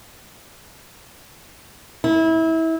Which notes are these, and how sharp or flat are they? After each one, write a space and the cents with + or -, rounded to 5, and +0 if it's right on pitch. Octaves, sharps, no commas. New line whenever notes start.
E4 -25